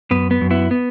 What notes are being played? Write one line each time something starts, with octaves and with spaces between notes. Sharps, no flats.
F#2 B3
B3
F#2
B3 E4
B3